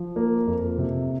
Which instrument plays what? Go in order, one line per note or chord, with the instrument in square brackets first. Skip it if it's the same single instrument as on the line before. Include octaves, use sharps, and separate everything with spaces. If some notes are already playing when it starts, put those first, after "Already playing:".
Already playing: [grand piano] F3
A#3
F2
C3